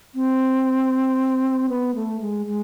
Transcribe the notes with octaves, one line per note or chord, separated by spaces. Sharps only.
C4
B3
A3
G#3
G#3